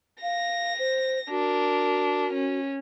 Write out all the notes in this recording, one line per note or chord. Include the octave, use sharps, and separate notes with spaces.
F5 A#6
C5
D4 F#4 A#4
C#4